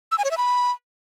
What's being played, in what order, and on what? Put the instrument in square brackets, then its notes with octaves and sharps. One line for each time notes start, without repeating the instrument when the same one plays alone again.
[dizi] E6
G#5
C#5
E5
B5